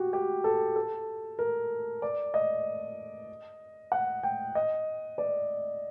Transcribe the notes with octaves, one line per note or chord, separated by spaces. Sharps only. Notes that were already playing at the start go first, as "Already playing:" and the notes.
Already playing: F#4 G4
G4
A4
A4
A#4
D5
D#5
F#5
G5
D#5
D5